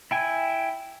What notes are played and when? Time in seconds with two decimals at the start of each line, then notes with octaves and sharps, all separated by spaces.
0.11 E4 G5 G#5